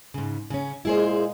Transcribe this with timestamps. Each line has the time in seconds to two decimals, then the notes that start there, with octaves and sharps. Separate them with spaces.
0.14 G#2 C#3
0.50 C#3 C#4
0.85 A#2 G#3 E4 G#4 C5